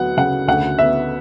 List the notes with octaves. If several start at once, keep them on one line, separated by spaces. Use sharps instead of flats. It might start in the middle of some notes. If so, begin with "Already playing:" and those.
Already playing: D2 F#3 B3 F#5
C#3 F#5
D2 F#5
B3 E5